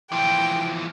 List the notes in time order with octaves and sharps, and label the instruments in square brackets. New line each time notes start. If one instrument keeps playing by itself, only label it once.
[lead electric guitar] E3 F3 [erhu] G5